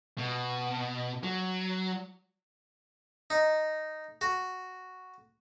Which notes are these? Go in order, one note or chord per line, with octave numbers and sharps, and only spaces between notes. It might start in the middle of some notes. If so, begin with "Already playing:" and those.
B2
F#3
D#4
F#4